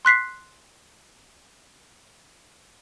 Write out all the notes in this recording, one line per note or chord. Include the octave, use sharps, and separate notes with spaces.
C6 F#6 B6 C7